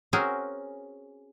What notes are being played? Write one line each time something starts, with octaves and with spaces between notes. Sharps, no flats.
C4 C#4 F#4 G#4 A#4